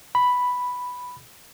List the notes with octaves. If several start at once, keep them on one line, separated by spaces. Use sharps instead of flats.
B5